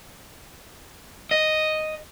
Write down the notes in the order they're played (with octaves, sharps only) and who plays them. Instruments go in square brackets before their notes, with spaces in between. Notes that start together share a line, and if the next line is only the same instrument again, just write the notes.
[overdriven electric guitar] D#5